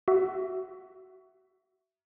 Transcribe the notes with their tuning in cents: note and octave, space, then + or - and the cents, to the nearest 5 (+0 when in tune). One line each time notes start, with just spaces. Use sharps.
F#4 +25 E5 +10